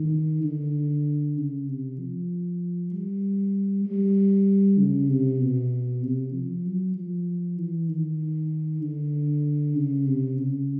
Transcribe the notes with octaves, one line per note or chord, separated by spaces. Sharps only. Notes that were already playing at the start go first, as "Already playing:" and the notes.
Already playing: D#3
D3
C#3
C3
F3
G3
G3
C#3
C3
B2
C3
F3
F#3
F3
E3
D#3
D3
C#3
C3
C#3